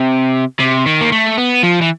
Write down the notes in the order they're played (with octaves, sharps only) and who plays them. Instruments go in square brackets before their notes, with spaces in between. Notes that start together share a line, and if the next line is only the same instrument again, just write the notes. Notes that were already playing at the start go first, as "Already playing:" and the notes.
Already playing: [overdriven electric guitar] C3
C3
D#3
A#3
A3
B3
F3
E3